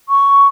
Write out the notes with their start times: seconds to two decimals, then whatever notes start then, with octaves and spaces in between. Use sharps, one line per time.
0.09 C#6